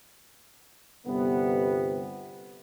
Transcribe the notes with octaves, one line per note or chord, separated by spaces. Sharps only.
G1 C3 G3 B3